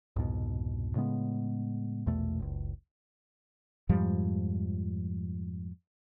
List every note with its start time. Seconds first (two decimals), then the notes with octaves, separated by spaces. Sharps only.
0.16 C2 F2 G#2 B2
0.96 A2 C#3 G#3 B3
2.06 A#1 E2 B2 A3
2.39 F#1 C#2
3.89 F2 G#2 F3 G3